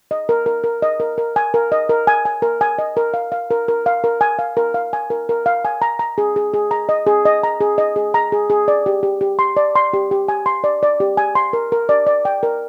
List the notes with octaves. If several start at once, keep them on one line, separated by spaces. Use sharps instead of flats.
D#5
A#4
A#4
A#4
D#5
A#4
A#4
G#5
A#4
D#5
A#4
G#5
G#5
A#4
G#5
D#5
A#4
F5
F5
A#4
A#4
F5
A#4
G#5
F5
A#4
F5
G#5
A#4
A#4
F5
G#5
A#5
A#5
G#4
G#4
G#4
A#5
D#5
G#4
D#5
A#5
G#4
D#5
G#4
A#5
G#4
G#4
D5
G4
G4
G4
C6
D5
C6
G4
G4
G#5
C6
D5
D5
G4
G#5
C6
A#4
A#4
D5
D5
G5
A#4